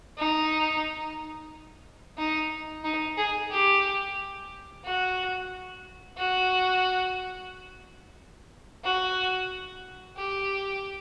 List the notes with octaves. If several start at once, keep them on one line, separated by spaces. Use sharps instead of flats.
D#4
D#4
D#4
G#4
G4
F#4
F#4
F#4
G4